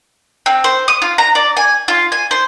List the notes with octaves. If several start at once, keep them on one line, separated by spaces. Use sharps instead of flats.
C4
C5
D#6
F4
A#5
D5
G#5
F4
G#5
C5